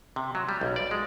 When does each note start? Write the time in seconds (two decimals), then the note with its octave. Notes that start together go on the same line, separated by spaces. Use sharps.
0.16 C3
0.35 F#3
0.49 G3
0.61 B1
0.76 D5
0.91 G#3